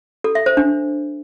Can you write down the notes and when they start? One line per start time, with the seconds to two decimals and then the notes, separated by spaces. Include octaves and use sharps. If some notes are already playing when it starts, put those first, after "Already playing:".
0.24 A4
0.35 E5
0.46 C5
0.57 D4